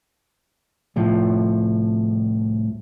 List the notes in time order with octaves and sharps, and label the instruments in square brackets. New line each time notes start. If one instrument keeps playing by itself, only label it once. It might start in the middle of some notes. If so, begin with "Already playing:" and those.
[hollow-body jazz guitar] C2 A2 F3